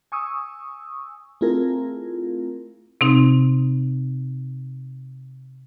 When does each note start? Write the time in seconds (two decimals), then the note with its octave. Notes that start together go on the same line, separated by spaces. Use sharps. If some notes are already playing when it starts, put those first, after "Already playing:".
0.12 G#5 C#6 D#6 E6
1.41 A3 C4 E4 F4 G#4 A#4
3.01 C3 C4 D#4